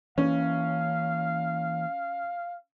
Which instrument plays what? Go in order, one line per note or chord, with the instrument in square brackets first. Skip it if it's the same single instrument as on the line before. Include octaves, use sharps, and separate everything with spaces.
[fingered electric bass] E3 A#3 [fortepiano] C#4 [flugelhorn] F5